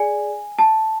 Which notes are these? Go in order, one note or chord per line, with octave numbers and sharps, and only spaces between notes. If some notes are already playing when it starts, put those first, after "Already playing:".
Already playing: G#4 D5 G#5
A5